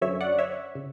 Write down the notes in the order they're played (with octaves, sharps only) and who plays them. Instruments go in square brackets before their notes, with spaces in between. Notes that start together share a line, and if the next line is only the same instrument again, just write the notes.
[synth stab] F#2 D3 F#3 C#4 C#5 E5
D5 F#5
C#5 E5
C#3